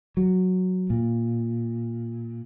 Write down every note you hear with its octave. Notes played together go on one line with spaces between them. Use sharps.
F#3
A#2